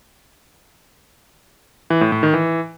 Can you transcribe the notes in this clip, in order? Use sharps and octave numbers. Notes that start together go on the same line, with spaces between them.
E3
A2
A2
D#3
E3